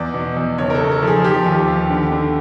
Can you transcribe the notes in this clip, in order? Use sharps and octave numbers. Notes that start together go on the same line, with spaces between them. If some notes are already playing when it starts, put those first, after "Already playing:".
Already playing: E2 D5
B2
E2
F#1 C#5
A#4
A4
F#1
A4
F3 G#4
F3 G4
D#2
D#2
D3
D3